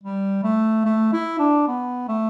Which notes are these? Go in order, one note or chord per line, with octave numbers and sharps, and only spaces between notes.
G3
A3
A3
E4
D4
B3
A3